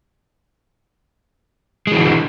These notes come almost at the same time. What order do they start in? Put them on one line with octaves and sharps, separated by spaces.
G#3 E3 D3